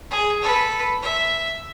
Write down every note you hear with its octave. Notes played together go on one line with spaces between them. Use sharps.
G#4
A4 B4
E5